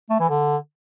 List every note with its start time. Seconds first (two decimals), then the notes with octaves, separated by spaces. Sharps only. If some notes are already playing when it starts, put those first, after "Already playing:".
0.10 A3
0.20 E3
0.29 D3